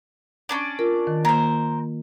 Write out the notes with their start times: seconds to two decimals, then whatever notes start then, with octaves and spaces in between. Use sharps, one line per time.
0.49 C#4 D4 D5
0.79 F4 A#4
1.07 D#3
1.25 A#3 A#4 C5